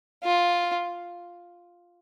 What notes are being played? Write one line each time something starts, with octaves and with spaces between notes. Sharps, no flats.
F4